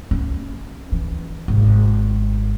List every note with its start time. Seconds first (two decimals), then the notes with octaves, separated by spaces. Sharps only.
0.11 C#4
0.92 E3
1.48 G#1